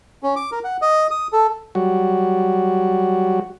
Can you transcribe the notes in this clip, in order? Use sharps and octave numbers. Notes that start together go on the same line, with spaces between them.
C#4
D6
A#4
F#5
D#5
D#6
A4
F#3 G3 F#4